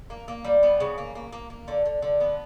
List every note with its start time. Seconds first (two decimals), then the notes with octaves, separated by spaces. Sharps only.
0.10 A#3
0.28 A#3
0.45 G3
0.63 B3
0.80 C#3
0.98 A#3
1.15 A#3
1.33 A#3
1.50 A#3
1.68 D3
1.86 D3
2.02 D3
2.20 B3